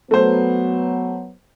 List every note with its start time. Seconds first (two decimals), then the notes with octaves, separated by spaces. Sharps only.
0.11 F#3 A3 B3 C5